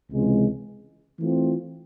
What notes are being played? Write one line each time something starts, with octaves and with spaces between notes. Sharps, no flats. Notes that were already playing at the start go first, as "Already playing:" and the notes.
C#2 C3 E3 G#3
E3 A3 C4 F4